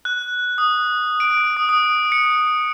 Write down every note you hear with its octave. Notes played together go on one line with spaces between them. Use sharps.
F#6
D#6
D7
D#6
D#6
C#7